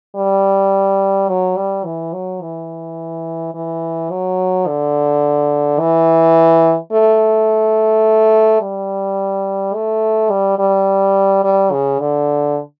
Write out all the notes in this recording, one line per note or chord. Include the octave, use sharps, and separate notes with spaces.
G3
F#3
G3
E3
F#3
E3
E3
F#3
D3
E3
A3
G3
A3
G3
G3
G3
C#3
D3